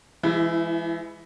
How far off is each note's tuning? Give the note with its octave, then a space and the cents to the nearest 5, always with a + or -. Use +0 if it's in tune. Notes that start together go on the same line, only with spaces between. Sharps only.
E3 +35 G#3 +0 E4 +0